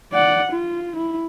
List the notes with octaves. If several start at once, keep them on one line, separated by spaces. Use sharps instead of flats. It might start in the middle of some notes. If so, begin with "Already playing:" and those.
D5 F#5
F4
E4